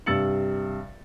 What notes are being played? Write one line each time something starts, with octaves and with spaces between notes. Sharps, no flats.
G2 C3 E6 A6 C#7 F#7